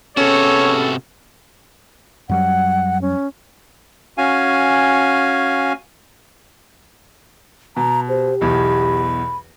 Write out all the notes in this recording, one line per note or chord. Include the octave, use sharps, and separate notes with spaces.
C3 B3 C#4 F#4 G#4 A4 C#5
F#2 F#3 G3 F#5
C#4
C#4 F#4 F5 G#5
B2 A#5
G4 C5
B1 E2 B5